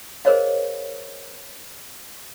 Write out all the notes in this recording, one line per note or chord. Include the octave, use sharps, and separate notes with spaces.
G#4 A#4 C5 C#5 D#5 F5